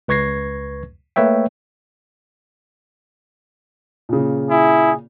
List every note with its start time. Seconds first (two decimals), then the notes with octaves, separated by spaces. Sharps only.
0.08 C#2 B4 C#6 G#6 A#6 C7
1.16 A3 A#3 B4 C#5 E5 G5
4.09 A#2 C#3
4.50 E4 G#4